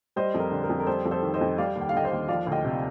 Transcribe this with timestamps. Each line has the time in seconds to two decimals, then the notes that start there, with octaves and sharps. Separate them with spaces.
0.16 G3 C5 D#5
0.34 F2
0.40 A#4
0.51 D3
0.64 A#4
0.69 F2
0.79 A#4
0.87 G3 A4 C5
1.05 F2
1.11 A4 C5
1.23 D#3
1.34 C5 D#5
1.41 F2
1.58 G3 D5 F5
1.75 D#2
1.81 G5
1.89 F5
1.93 D3 D#5 G5
2.05 C5 D#5
2.11 D#2
2.28 F3 D5 F5
2.47 D2
2.52 D#5 G5
2.65 C3